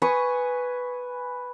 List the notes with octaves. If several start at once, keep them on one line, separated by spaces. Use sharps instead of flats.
B4 G#5 C#6 D#6